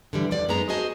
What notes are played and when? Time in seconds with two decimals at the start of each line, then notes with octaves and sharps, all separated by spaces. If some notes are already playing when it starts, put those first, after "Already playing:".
0.13 D3 E3 G3
0.31 E2 D3 F3 A3 D5
0.49 F#2 G#3 B3 D#4 A#5
0.69 F#4 G#4 C5 D#5 G#5 A5